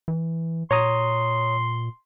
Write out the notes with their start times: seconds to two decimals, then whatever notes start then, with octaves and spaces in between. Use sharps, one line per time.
0.08 E3
0.71 A#2 C#5 A#5 C6 D#6